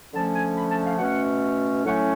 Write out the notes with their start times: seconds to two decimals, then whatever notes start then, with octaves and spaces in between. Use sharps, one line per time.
0.13 D3 F3 A3 C#4 A5
0.34 G#5
0.56 B5
0.70 A5
0.85 F5
0.98 B2 A3 C#4 F#5
1.84 A2 F#3 A3 C#4 F#5